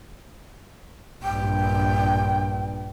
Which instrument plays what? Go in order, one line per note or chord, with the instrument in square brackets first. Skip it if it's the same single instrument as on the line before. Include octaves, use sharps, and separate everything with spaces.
[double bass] A#1 G2 [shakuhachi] G5